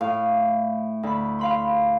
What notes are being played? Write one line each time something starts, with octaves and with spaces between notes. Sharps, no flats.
A2 F5
D2 B5
F5 B5 C6